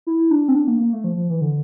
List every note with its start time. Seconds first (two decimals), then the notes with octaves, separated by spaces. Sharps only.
0.07 E4
0.31 D4
0.48 C4
0.55 D4
0.67 A#3
0.80 A#3
0.93 A3
1.04 F3
1.16 F3
1.30 E3
1.41 D3